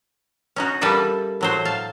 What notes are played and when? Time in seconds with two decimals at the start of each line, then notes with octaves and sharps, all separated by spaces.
0.56 C#4 D#4 F#4
0.81 G3 A#3 A4 B4 E5
1.41 A2 F#3 C5
1.65 F5 A5